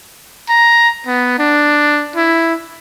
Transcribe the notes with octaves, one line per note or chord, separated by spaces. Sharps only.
A#5
B3
D4
E4